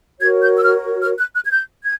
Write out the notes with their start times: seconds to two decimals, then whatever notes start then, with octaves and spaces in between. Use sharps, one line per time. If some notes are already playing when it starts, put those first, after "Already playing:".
0.21 F#4 A#4 C#5 G#6
0.42 G6
0.56 E6
0.64 F6
1.02 F6
1.18 F#6
1.35 F#6
1.44 G#6
1.51 G6
1.84 G#6